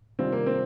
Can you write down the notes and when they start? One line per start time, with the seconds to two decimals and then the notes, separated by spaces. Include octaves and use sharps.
0.19 C3 D#3 G3 C4 D4 F4
0.32 A#3
0.46 C4